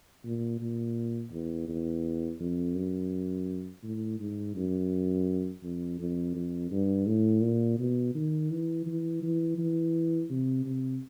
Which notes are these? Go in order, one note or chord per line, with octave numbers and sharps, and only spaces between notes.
A#2
A#2
E2
E2
F2
F#2
A2
G#2
F#2
F2
F2
F2
G2
A2
A#2
B2
D#3
E3
E3
E3
E3
C3
C3